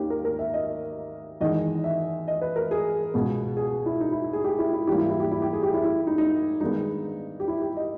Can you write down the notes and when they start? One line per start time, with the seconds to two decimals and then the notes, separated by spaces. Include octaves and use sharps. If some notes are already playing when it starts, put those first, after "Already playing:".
Already playing: D#2 D#3 A#3 C#4 G4
0.10 A#4
0.25 A#4
0.39 E5
0.54 D#5
1.41 E2 D#3 G#3 D#5
1.84 E5
2.28 D#5
2.41 B4
2.56 A#4
2.71 G#4
3.14 C#2 B2 G#3 B3
3.57 G#4
3.86 E4
4.01 D#4
4.12 E4
4.33 G#4
4.44 G4
4.59 E4
4.73 E4
4.87 G#2 E3 G3 A#3 G4
4.98 E4
5.10 E4
5.20 G4
5.31 E4
5.42 G4
5.53 G#4
5.63 G4
5.74 E4
5.85 E4
6.07 D#4
6.18 D#4
6.61 G2 D#3 G#3 B3 D#4
7.40 G4
7.48 E4
7.62 G4
7.76 D#5